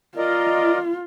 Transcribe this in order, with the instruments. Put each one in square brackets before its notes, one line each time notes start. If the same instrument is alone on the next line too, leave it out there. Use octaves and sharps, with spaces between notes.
[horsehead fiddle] F4 [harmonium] A#4 D5 D#5